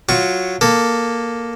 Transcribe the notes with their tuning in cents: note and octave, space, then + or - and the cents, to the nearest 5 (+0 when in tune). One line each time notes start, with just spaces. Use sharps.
F#3 +0 F4 +10 C#6 +0
A#3 +5 A4 +15